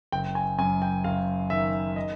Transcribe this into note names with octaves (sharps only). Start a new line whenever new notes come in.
F#1 G5
G#5
F#2 G#5
G5
F#1 F5
D#3 E5
D#5